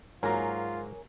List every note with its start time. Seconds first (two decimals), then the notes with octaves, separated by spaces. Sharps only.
0.23 G#2 F#3 A#3 F4 A#4 C#5 G#5